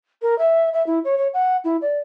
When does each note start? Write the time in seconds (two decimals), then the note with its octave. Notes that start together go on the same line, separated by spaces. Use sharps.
0.22 A#4
0.39 E5
0.73 E5
0.86 E4
1.04 C#5
1.18 C#5
1.34 F#5
1.64 E4
1.82 D5